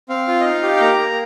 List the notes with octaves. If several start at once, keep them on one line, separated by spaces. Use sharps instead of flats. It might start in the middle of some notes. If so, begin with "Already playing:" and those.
C4 F5
F4
D#5
D#4 F5
G4
G5
A#3 A#5
A#3